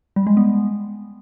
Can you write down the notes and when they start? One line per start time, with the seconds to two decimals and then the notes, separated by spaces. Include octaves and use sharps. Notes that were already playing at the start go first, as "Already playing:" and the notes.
0.16 G3
0.27 G#3
0.37 B3